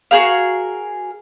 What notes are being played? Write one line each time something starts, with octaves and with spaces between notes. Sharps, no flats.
F#4 G#4 A#4 F5